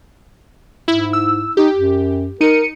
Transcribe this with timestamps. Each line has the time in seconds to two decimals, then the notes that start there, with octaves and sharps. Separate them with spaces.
0.88 G#2 E4
1.13 E6
1.57 D#4 G4
1.75 F#2
2.41 D#4 A#4 C#7 D#7